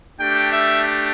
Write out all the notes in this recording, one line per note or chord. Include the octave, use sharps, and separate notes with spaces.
A3 D4 G4 G5
E5